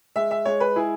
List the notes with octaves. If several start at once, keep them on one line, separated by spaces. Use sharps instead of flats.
G#3 E5
E5
G#3 C#5
B4
E4 G#4